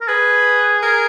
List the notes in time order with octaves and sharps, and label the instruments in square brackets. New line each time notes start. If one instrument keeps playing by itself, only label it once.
[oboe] A#4
[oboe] G#4 [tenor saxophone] B4
[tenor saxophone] A#4